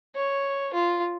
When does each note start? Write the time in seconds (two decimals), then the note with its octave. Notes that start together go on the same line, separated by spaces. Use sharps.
0.16 C#5
0.74 F4